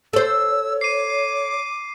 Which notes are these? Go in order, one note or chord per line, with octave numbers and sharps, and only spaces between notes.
A4 C5 C#5 E6
D6 C7 D#7